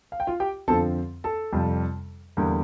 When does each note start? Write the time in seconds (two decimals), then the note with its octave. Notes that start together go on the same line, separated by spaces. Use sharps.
0.12 F5
0.20 G5
0.27 F4 F5
0.40 G4 G5
0.68 F2 D3 F3 C4 A4 A5
1.24 A4 A5
1.53 F2 C3 G3
2.37 E2 D3 G3 A#3